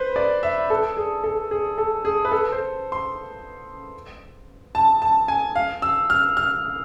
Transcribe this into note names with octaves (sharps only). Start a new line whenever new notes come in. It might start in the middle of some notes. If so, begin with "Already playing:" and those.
Already playing: B4 C5
D5
E5
A4
G#4
A4
G#4
A4
G#4
B4
A4
C5
C6
A5
A5
G#5
F5
E6
F6
F6